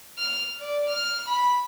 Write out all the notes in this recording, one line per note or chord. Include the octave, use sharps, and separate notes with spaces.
F6
D5
F6
B5